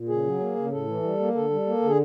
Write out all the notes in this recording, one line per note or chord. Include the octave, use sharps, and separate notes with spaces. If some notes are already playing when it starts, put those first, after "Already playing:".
Already playing: A#2
C#3 G#4
F#3
A#3
C#3
A2 A4
E3
G3
A#3
D3 A4
G3
A#3
D3 G#4